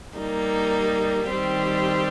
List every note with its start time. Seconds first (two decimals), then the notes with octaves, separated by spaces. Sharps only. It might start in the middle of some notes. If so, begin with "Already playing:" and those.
0.18 G3 A#3 D#4
1.30 D#3 G3 C4 G4